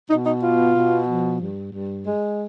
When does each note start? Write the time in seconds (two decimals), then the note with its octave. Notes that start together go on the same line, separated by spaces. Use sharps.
0.10 B2 D#4
0.26 D#4
0.42 B3 F4
0.75 B2
1.07 F3
1.40 G2
1.72 G2
2.05 G#3